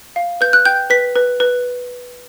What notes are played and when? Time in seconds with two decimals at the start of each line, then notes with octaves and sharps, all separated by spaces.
0.16 F5
0.41 B4 G6
0.53 F#6
0.65 G5 G6
0.90 B4 B6
1.15 B4
1.40 B4